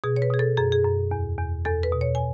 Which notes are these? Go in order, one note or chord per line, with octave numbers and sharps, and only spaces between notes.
B2 G#4
C#5
B4
B2 G#4
A4
F#2 G#4
G#4
F#2
E2
E2
E2 A4
B4
B2
C#5
G#5